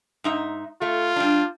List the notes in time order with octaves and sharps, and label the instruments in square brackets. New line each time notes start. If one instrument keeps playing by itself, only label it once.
[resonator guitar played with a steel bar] G#2 D#4 E5
[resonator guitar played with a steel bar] A3 [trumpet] F4
[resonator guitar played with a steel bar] G3 D4